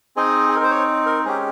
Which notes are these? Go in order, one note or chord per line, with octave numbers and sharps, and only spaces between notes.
C4 D#4 G#4 D#5
G#4
A#4
C5
C#5
A#4
G#3 C#4 G4 G#4